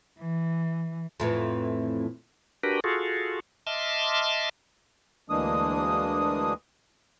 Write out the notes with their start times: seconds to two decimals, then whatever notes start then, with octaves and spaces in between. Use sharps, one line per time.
0.20 E3
1.20 F2 A2 E3
2.64 D4 F#4 G4 A#4 B4
2.84 F4 F#4 G#4 A4
3.67 D#5 E5 A5 C6 D6 F6
5.30 D2 E3 G#3 A#3 D4 D#6